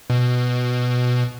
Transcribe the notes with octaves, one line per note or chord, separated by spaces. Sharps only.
B2